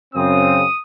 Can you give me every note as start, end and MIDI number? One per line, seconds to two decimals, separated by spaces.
0.15 0.64 42
0.15 0.64 49
0.15 0.64 60
0.15 0.81 87